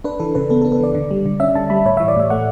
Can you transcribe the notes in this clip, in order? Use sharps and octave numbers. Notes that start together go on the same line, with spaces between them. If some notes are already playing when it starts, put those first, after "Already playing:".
D4 B4
E3 A4
C#3 B4
B3 A4
A4
D4
A4
E3 D5
D3
G3
D3
C#4 E5
D3 A5
G3 B5
A2 C#5
E3 E5
D5
A2 E5
A3 F#5